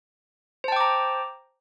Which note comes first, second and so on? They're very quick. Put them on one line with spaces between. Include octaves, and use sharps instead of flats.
C5 A5 G5 D6 A#5